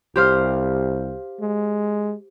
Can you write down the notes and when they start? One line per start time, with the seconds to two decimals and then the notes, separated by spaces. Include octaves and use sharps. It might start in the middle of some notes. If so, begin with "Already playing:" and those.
0.16 C2 G4 C5 F5
1.40 G#3